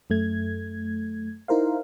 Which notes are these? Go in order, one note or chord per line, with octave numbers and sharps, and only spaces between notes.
F#2 A3 G#6
D#4 E4 A#4 C5 F5